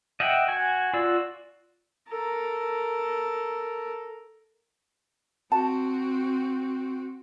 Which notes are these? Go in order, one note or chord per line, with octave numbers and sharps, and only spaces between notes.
D#5 E5 F#5 G5
F#4 G#5
F4 F#4 D5 E6
A4 A#4
C4 F#4 A5